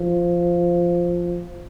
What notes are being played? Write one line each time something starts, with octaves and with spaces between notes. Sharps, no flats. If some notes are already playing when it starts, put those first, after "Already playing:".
Already playing: F3